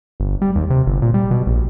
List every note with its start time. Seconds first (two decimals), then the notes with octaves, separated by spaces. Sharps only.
0.20 G1
0.42 G3
0.55 D#2
0.70 C3
0.87 G1
1.02 A#2
1.14 G3
1.31 B2
1.47 A#1